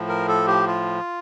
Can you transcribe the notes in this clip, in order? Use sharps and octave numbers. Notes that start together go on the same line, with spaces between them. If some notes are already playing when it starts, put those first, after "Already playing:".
Already playing: A2 F3
A#4
A4
G4
F4